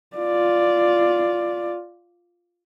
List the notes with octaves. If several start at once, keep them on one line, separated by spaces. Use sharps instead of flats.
F4 D5